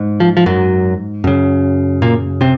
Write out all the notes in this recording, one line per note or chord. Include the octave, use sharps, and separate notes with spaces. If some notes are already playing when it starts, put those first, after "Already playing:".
Already playing: G#2
F3
F3
F#2 F#3
F#2 C#3
A#2 A#3
C3 C4